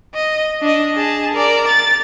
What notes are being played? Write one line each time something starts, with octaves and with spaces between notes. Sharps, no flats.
D#5
D4 D#5
G#4 A5
A#4 D5
A6